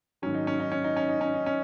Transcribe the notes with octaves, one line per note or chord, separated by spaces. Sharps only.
G#2 D#3 F#3 C#4
D#4
C#4
D#4
C#4
D#4
C#4
D#4
C#4
D#4
C#4